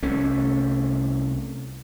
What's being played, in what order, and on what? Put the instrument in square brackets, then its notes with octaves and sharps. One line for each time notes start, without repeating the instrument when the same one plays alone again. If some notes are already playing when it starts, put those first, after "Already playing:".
[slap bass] C2 C3 A3 C#4